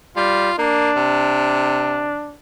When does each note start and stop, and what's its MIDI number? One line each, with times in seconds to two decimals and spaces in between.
0.17 0.50 55
0.17 0.56 65
0.59 0.90 58
0.59 2.36 62
0.96 2.15 48